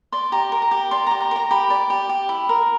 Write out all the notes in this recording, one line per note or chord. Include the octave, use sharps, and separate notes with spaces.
D5 C6
G4 A#5
A#4
A#5
G4
D5 C6
A#5
G4
A#5
A#4 A#5
G4 B5
D5
G4
G4
E4
A#4